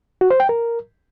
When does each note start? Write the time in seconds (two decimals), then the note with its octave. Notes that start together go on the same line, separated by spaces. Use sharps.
0.21 F#4
0.30 C5
0.40 G5
0.49 A#4